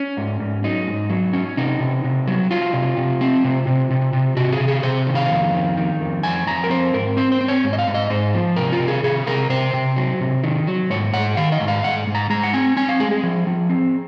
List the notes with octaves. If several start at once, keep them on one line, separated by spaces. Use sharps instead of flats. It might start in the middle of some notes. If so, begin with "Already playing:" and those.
Already playing: C#4
G#2
G#2
F#3 D#4
G#2
F#3
C#4
C3 D#4
C3
C3
F#3
F#3 F4
C3
C3
C4
C3
C3
C3
C3
C3 F#4
G#4
C3
G#4
C3 C5
D#3
F5
F2
D#3
D#3
F2
F2 G#5
F2 A#5
A#4
C4 C5
G#2 A#4
C4 C5
C5
C4
C#5
G#2
D#5
F5
G#2
D#5
G#2 C5
F3
C3 A#4
F4
C3
G#4
C3 G#4
C3 A#4
C3 C5
C3
F#3
C3
D#3
F#3
G#2 C#5
G#2 F#5
D#3 F5
D#5
G#2
F5
G#2 F#5
G#2
A#5
G#3 A#5
F#5
C4 G#5
C4 G#5
F5
G#3 G#4
G#4
F3
F3
C4